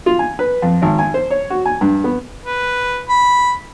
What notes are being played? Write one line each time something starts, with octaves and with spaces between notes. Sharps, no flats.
F4
G#5
B4
F2
G#1
G#5
C5
C#5
F#4
G#5
G2
B3
B4
B5